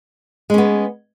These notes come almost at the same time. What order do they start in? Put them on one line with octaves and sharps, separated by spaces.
G#3 C#4 B3